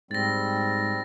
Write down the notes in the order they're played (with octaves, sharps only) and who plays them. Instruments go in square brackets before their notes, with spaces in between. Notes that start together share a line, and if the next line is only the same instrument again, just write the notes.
[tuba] G#2 [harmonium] G3 C4 [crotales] A6 A#6